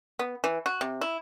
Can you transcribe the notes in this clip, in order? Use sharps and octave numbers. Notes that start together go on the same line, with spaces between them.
B3
E3
F#4
C3
E4